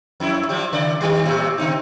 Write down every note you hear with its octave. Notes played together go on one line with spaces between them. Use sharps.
F2 E4
F3 G3 G4
C#3 D5
D#3 G3
A2 C3
C#3 C4 D#4